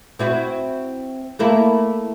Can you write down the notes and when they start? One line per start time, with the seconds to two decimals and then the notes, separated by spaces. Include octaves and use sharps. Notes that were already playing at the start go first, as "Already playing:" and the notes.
0.19 C4 E4 F#4
1.39 A3 A#3 E4